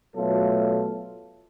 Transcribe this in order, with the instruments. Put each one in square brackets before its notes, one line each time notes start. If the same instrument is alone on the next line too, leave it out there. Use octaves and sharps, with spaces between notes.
[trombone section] B2 F#3 A3 F4 A4